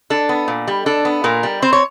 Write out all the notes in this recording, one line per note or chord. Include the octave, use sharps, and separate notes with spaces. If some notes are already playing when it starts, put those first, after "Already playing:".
D4 A4
B3
A#2
G3
D4 A4
B3
A#2 A#4
G3
C4 C5
C#5